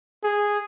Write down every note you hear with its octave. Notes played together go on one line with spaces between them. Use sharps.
G#4